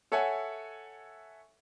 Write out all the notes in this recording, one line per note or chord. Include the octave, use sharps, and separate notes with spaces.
A4 C#5 E5 F#5 G#5